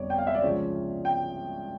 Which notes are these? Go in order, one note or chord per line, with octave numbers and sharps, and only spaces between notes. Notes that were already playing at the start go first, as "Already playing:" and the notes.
Already playing: G1 F2 D3 G3 C#5 D5
G5
F5
E5
D5
C#2 C#3 F3 C#5
G5